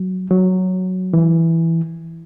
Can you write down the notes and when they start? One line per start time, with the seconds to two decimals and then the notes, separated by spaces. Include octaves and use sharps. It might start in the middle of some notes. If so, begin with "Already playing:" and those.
Already playing: F#3
0.30 F#3
1.13 E3